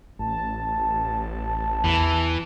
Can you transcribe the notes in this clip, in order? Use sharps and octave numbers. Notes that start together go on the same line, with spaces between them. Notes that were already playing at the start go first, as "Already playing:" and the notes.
A1 A5
E2 E3